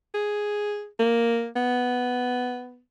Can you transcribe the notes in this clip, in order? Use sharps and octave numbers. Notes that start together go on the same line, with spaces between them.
G#4
A#3
B3